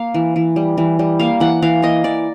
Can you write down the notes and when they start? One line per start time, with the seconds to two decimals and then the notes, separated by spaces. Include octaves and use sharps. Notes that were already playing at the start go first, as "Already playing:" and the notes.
Already playing: A#3 F5
0.14 E3
0.36 E3
0.56 G3
0.77 E3
0.99 G3
1.19 A#3 F5
1.40 E3 F#5
1.62 E3 F5
1.82 A#3 D#5
2.04 E3 D5